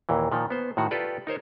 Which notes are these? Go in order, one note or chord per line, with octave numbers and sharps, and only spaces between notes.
D#2 A#2 E3
A#2 D#3 F3
B3 C5
A2 D#3 F#4
F4 G4 A4 B4 D5
D#4 A#4 C5 C#5